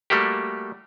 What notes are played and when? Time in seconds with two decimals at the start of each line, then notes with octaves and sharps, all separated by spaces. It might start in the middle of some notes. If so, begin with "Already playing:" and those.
0.10 G3 A3 A#3 F#4 G4